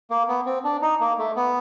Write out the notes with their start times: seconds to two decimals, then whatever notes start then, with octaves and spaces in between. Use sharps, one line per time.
0.11 A#3
0.28 B3
0.46 C4
0.64 D4
0.82 D#4
1.00 A#3
1.19 A3
1.36 B3